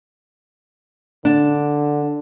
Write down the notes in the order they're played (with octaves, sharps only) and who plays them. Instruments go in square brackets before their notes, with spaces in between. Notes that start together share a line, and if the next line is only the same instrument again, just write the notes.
[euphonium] D3 [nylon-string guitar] D4